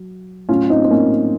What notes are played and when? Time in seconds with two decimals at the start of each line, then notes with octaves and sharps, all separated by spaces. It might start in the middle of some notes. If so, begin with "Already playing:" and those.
Already playing: F#3
0.49 A2 F#3 C#4 F4
0.70 C4 D#4
0.84 C4
0.90 A#3 C#4